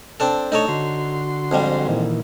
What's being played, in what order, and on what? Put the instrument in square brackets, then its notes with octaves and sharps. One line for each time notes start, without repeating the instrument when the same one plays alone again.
[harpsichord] C4 D4 A4
[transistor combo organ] A3 D4 D#5 [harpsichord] D#4 A4 C#5
[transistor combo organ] D3 F#4 C6
[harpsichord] F2 G#2 G3
[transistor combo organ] A#2 D#3 E3